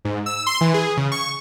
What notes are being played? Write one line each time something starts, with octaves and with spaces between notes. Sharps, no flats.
G#2
E6
C6
E3
G#4
C#3
C#6